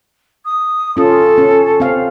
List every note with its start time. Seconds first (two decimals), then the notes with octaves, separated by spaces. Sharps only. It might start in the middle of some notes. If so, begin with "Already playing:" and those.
0.45 D#6
0.97 C#4 F4 A4
1.38 C#4
1.80 C4 F5